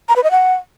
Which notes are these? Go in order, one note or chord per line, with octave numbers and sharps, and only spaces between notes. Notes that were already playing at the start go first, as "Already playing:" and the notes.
A#5
B4
D#5
F#5